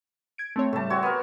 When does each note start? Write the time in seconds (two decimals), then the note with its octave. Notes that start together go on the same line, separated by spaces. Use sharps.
0.38 G#6 D7
0.56 A3 C4 C#5
0.73 A2 C#3 G3 A3 A5
0.90 C4 F#4 C#5
1.03 B3 A#4